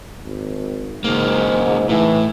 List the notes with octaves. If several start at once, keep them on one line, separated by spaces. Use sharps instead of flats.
G#1
C#2 G#2 A#3
A2 E3